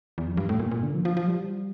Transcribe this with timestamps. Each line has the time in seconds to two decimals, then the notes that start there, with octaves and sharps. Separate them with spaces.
0.18 E2
0.27 F2
0.37 G2
0.49 A2
0.60 A#2
0.71 A#2
0.83 D3
0.94 F3
1.05 F3
1.17 F3
1.28 G3